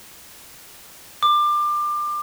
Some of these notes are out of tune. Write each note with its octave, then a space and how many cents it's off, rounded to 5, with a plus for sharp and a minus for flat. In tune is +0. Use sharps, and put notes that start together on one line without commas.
D6 +25